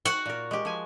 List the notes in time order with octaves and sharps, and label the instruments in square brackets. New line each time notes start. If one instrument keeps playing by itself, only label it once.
[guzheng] F#4 F#5
[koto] A#2 A#4
G#3 G4
F3 G#5